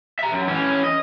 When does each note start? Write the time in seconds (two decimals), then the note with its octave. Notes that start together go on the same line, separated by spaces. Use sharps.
0.19 E5 A#5
0.32 F#2
0.48 E3 C#4
0.84 D#5